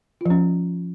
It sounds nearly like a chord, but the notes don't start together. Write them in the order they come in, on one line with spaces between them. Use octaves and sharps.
F4 F3 C#4